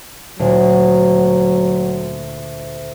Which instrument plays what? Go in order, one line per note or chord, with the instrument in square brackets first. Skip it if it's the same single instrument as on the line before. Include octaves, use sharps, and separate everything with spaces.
[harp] D2 A#2 [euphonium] F#3